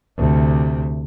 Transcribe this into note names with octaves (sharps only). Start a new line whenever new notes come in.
D2 C3